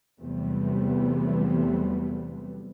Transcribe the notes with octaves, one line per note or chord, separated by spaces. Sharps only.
E2 C3 F#3 G3 A3 B3